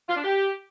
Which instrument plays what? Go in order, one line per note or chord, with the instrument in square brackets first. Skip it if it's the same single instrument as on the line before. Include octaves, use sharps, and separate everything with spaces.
[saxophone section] F4
D4
G4